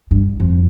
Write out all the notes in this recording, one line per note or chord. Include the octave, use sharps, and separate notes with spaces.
G2
F2